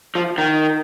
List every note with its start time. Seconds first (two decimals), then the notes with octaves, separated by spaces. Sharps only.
0.15 F3
0.38 D#3